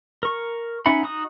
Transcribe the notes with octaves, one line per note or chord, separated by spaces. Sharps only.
A#4 C#6
C#4 D#4 E5 F#5 B5
D#4 F#4 D#6